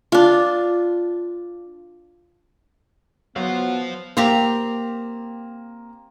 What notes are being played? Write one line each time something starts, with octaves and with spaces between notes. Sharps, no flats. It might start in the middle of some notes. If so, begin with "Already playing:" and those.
D4 F4
F#3 B3 C5 F5
A#3 C4 G4 A#5